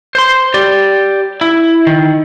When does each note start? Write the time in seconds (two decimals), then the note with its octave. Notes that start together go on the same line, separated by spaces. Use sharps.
0.15 C5 C6
0.54 G4 D5
1.41 E4
1.87 D#3